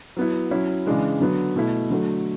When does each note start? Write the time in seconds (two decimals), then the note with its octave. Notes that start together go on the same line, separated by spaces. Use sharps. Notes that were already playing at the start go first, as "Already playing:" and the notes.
0.17 F#3 B3 E4
0.51 F#3 C#4 E4
0.86 C#3 E3 G#3 D4
1.20 D3 F#3 B3
1.56 B2 A3 E4
1.90 D3 F#3 A3